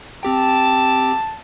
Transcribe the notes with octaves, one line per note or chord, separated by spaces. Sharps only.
C4 G4 G5 A5